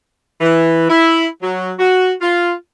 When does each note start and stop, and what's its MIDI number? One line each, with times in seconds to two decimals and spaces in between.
0.41 0.87 52
0.89 1.26 64
1.42 1.72 54
1.79 2.13 66
2.21 2.52 65